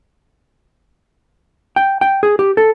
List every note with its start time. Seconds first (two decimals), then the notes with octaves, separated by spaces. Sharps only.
1.76 G5
2.01 G5
2.23 G#4
2.39 G4
2.57 A4